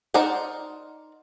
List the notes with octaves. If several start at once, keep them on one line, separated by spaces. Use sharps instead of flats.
D#4 A#4 C5 D5 F#5